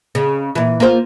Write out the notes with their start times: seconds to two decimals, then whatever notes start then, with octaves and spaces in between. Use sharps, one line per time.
0.15 C#3
0.55 A#2 E3
0.80 A#3 F4 C5